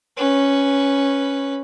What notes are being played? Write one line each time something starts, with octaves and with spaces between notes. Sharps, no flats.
C#4 B4